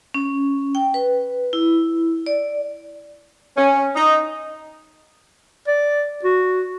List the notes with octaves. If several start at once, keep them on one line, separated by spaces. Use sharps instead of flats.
C#4
G5
B4
E4
D5
C#4
D#4
D5
F#4